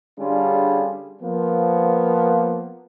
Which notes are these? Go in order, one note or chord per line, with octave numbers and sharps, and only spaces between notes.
D3 G3 C#4 D4 F4 G#4
F3 A#3 B3